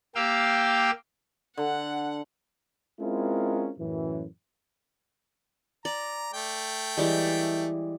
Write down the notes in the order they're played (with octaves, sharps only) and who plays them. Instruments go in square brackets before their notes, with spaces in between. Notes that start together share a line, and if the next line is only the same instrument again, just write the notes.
[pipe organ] A#3 G4 F5 G5 D6 E6
[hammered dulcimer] D3 [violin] F#5
[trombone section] G#3 C4 C#4 E4 F4 A#4
F#2 A2 E3
[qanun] D5 [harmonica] A#5
[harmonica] A3 G5
[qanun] E3 G3 G#3